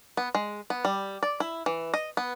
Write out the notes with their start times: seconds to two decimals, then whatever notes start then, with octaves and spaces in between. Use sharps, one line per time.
0.17 B3
0.35 G#3
0.70 B3
0.85 G3
1.23 D5
1.40 E4
1.66 E3
1.94 D#5
2.17 B3